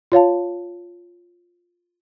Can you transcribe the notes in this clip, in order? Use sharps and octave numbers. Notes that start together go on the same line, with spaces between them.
F4 C#5 F5 A5